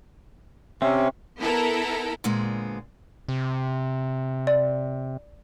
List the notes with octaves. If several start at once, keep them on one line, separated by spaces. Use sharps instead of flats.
C3 C4 C#4 E5
B3 E4 A4 A#4
A#2 D3 G#3 B3 C4
C3
D5